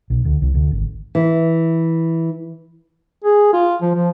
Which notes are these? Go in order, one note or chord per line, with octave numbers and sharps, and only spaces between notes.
B1
D2
C2
D2
G#1
E3
G#4
F4
F3
F3